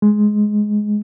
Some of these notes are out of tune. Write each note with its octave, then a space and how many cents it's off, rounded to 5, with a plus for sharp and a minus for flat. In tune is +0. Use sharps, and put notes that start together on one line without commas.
G#3 +10